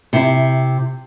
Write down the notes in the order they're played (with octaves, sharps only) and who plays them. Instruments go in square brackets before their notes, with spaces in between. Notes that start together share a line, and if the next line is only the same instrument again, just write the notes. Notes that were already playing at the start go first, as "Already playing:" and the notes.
[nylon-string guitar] C3 E4